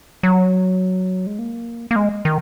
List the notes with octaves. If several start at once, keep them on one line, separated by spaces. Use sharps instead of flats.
F#3
G#3
A#3
A#3
G#3
D#3